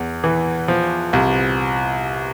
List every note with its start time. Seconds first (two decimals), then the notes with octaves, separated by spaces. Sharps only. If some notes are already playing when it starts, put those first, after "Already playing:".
Already playing: E2
0.24 E3
0.68 F3
1.13 C2